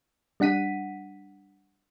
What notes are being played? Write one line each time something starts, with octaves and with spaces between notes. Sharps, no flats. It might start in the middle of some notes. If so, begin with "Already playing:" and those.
G3 D4 F#5 B6 D#7